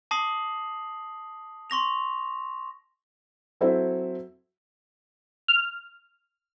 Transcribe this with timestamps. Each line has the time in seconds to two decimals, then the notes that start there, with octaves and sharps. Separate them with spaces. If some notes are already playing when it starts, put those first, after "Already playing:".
0.11 A5 D6 D#6 A#6 C7 F#7
1.70 C6 C#6 A#6 F7
3.61 F#3 C4 E4 A4 C5 E5
5.48 F6